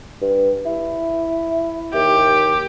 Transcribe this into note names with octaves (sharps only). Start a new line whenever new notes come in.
G2
E4
D#2 G4